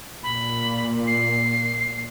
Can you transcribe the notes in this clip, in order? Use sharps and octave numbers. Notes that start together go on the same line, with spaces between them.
A#2 B5
C7